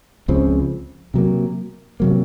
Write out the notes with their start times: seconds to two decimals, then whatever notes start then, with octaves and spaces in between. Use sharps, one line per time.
0.28 C#2 C#3 F3 C4
1.14 C3 F#3 A#3
2.00 C3 F#3 A#3